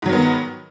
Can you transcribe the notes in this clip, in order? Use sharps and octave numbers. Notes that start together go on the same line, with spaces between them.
G#2 D#3 F#3 B3